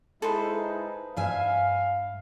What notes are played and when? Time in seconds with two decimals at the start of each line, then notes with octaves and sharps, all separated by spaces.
0.22 G#3 D#4 E4 A4 B4 C5
1.17 G2 E5 F5 G#5